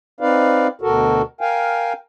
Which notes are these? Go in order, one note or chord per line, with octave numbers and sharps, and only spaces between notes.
C4 D#4 B4 D5 F5
D2 B2 F#4 A4 A#4
A#4 F5 G5 G#5